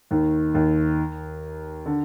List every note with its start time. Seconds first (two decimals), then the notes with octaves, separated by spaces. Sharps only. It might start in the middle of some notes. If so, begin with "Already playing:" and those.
0.11 D#2 D#3
0.54 D#2 D#3
1.86 D3